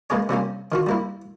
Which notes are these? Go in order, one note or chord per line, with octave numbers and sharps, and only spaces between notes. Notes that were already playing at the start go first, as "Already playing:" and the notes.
G#3 A#3 B3 G#4 C#5
C3 G3 A#3 C#4
D#3 F4 F#4
G3 A#3 E4